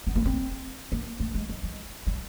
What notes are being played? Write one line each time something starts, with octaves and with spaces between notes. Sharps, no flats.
B3
A#3
C4
A#3
A3
G#3
G#3
G#3
G3